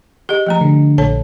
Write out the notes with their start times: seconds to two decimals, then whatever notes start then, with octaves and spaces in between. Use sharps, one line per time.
0.29 G4 G#4 D#5
0.46 F3 A3 A#5
0.61 D3
0.98 A#1 A4 C#5 A5